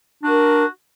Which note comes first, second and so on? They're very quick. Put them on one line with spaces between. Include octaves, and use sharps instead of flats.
D4 F#4 A#4